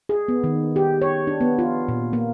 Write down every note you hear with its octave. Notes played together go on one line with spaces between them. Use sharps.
G#4
B3
D#3
G4
C#5
D4
B3
F4
A#2
A#3